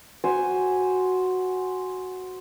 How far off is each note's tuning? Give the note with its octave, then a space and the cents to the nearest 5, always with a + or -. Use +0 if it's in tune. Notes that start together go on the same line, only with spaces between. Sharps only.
F#4 +0 C5 +0 G#5 +0